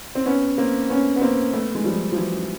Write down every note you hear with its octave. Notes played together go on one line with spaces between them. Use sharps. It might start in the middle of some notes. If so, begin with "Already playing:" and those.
C4
B3 C#4
A#3 C4
B3 C#4
B3
A#3 C4
A3 B3
G#3
F3 G3
F3
E3 F#3